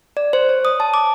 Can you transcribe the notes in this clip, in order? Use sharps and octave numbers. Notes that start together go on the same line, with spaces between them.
D5
C5
C#5
D#6
A5
D6